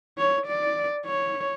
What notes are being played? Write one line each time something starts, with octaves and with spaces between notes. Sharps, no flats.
C#5
D5
C#5